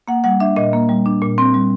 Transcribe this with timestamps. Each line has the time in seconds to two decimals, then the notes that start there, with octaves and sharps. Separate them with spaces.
0.08 A#3 F#5
0.24 G3 F#5
0.40 D4 E5
0.56 A#2 D#5
0.73 A#3
0.89 G3
1.06 D4
1.22 A#2
1.38 C4
1.54 G3